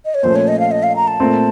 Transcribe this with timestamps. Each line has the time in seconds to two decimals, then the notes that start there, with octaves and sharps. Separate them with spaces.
0.05 D#5
0.15 C#5
0.23 A#2 F3 A3 C#4 C5
0.36 C#5
0.48 D#5
0.60 F5
0.71 D#5
0.83 F5
0.96 A#5
1.08 A5
1.20 A#2 A3 C4